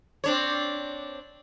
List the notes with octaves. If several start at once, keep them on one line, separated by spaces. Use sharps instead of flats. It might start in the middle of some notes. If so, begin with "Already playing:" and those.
C4 D4 C#5